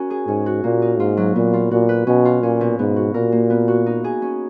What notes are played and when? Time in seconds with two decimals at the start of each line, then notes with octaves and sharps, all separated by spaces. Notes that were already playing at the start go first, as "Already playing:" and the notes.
Already playing: C#4 F#4 A#4
0.10 G#4
0.28 G#2 C#4
0.46 F#4
0.64 A#2 A#3
0.82 D#4
0.99 G#2 F4
1.17 F#3
1.36 A#2 B3
1.53 F4
1.71 A#2 F#4
1.89 B4
2.07 B2 C#4
2.25 F4
2.42 A#2 C#4
2.61 B2
2.79 G#2 B3
2.96 F#4
3.14 A#2 A#4
3.32 A#3
3.50 B3
3.68 F#4
3.86 D#4
4.04 G#4
4.22 C#4